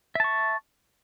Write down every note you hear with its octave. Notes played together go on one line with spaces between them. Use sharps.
E5 A5 C#6